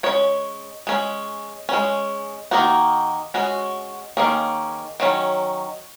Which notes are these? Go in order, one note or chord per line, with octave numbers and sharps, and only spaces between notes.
G#3 C#4 C#5
G#3 C#4
G#3 C#4
D#3 A#3 D#4 F#4
G#3 C#4 F#4
D#3 A#3 C#4 G#4
D#3 F#3 C#4